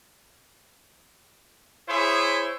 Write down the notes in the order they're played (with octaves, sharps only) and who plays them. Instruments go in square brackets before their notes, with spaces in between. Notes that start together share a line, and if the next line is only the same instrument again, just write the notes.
[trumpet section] E4 G#4 C5 C#5 E5